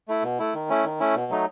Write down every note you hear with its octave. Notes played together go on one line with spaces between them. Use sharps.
A3 E4
B2
A3 E4
D#3
A3 C#4 E4
D#3
A3 C#4 E4
B2
F#3 A3 D#4